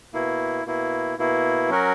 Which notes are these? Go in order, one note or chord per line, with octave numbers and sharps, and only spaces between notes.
B2 A#3 E4
B2 A#3 E4
B2 A#3 E4
F#3 C#4 F#4 A#4